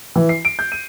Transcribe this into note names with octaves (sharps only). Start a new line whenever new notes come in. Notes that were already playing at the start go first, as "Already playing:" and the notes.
E3
C7
D7
G6
D#7